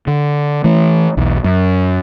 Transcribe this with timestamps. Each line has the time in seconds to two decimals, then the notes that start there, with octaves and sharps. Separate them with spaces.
0.07 D3
0.64 E3 A3
1.17 B1 E2
1.44 F#2